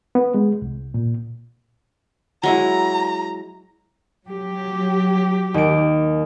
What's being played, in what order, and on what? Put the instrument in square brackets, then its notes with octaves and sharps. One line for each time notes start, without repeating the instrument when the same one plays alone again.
[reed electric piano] B3
G#3
C2
A#2
[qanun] F#3 G#3 E4 [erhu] A#5
[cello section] F#3 G4
[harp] D#2 D7